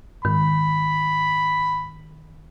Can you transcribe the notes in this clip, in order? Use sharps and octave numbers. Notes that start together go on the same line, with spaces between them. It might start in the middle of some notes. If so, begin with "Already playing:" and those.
G#2 D#3 B5